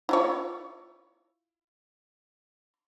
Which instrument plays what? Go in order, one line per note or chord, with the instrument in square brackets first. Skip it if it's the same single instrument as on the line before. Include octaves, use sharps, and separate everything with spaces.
[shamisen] E4 F4 C#5